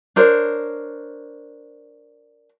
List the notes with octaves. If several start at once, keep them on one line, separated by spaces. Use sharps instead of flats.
D4 A#4 C5 C#5